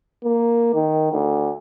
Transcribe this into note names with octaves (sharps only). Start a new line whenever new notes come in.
A#3
D#3
D2